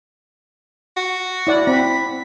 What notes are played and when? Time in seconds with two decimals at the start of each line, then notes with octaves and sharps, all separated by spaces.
0.97 F#4
1.47 E4 D5 F#5
1.67 C4 B5